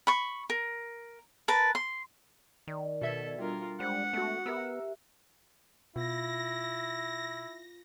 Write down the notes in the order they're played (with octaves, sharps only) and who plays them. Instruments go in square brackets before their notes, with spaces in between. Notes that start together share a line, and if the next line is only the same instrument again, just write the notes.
[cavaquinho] B5 C#6
A#4
A#4 B4 A5
C6
[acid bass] D#3 [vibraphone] D5
[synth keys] B2 E5 G#6 [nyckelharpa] A4
[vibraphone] G3 D4 [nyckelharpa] F4 A#4
[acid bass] G3 [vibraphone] G#3 D4 [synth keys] C5 [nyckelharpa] F#5
[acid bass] A3 [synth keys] B3 F#4
[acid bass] B3 [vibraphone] G4 E5 [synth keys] A#4 A#5 E6
[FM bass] B2 [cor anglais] E4 [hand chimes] F4 [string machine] A#6